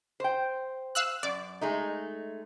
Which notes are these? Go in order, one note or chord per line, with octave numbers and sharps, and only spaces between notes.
C5 G5
F5 E6 F#6
F#2 D5
G#3 A3 D#4